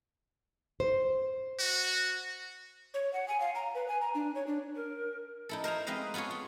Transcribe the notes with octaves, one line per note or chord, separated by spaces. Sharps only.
C5
F#4
C#5
F#5
G#5
F5
A#5
B4
G#5
A#5
D4
C#5
D4
A#4
D#4 E4 A4
A#4 C5 G#5 A#5
G#3 C4 B4 D#5 F5
B3 F4 G#4 A4 C#5
F4